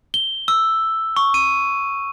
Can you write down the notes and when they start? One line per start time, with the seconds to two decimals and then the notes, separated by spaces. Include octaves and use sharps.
0.14 G7
0.48 E6
1.17 C#6
1.34 D#7